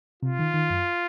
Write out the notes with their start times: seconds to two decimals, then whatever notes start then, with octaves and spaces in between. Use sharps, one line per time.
0.23 C3 F4
0.39 D#3
0.54 D#3
0.70 F#2